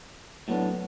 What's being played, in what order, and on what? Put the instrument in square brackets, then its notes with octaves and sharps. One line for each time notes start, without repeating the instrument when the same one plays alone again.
[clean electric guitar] A2 F#3 B3 D4